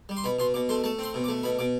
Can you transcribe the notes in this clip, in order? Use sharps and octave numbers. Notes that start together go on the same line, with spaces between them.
G3
C6
B2 B5
B2 C6
B2 D6
A3 C6
A3 A5
C4 C6
B2
D6
A3
B2 B5
B2 D6